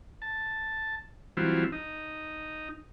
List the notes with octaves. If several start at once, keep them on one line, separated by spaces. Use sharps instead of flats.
A5
E3 F#3 G3 C4 E4 F4
D#4